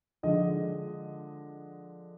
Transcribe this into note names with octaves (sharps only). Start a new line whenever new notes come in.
D3 F3 G#3 D#5